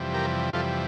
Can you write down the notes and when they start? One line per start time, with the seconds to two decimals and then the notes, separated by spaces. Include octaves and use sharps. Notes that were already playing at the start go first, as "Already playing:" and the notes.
Already playing: F2 C3 E3 G3
0.14 G4 A#4
0.53 F2 C3 E3 G3 F4 A4